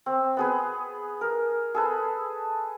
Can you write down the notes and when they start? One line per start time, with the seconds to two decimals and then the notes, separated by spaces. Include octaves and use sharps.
0.06 C4
0.37 B3 G#4 B4
1.21 A#4
1.74 G#4 A4 B4